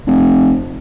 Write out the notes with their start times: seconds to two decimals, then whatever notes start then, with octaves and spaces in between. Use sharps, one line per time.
0.06 F1